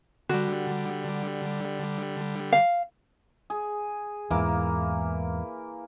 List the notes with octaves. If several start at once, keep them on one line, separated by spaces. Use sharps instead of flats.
D3 G3 F#4
F5
G#4
E2 G#2 E3 A#3 D6